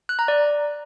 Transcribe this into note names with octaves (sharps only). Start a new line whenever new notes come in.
F#6
A#5
D5